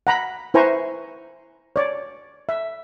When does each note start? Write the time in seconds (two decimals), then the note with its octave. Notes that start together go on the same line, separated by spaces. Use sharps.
0.07 F#5 A#5 B5
0.54 E4 B4 C5 G#5 A#5 C#6
1.76 C#5 D5
2.49 E5